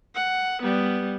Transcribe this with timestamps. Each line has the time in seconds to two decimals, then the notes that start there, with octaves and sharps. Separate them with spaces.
0.15 F#5
0.62 G3 B3